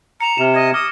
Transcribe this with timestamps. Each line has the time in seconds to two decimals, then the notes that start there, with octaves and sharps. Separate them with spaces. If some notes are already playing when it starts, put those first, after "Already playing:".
0.21 A#5 C#7 E7
0.38 C3 F6 E7
0.54 D#5 G#6
0.74 D6 D#6 F6 A#6